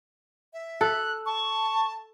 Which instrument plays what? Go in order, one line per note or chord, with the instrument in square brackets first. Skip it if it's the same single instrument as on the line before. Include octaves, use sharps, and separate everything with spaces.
[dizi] E5
[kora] A4 [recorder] F#6
[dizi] A5 [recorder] C#6